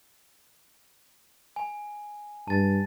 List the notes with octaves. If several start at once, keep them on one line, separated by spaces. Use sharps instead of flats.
G#5
G2 A5 A6